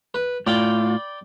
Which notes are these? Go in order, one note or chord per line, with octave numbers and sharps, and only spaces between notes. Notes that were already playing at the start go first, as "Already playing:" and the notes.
B4
A2 F4 D5 G5 B5